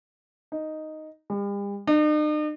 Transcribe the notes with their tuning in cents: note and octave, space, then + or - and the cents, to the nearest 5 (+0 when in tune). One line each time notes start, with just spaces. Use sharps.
D#4 +0
G3 +45
D#4 -45